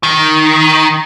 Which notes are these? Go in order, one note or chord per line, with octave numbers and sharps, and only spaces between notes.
D#3